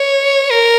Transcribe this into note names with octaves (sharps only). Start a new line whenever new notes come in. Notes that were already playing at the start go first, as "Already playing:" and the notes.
Already playing: C#5
A#4